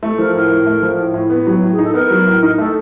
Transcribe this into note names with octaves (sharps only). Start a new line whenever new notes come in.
A3
F3 A#4
A2 A#4
A2
A3
F3
A2
A2
B3
F#3
A2
G#4
D#4
A4
B3 A#4
F#3
A2
D#4
A3 A4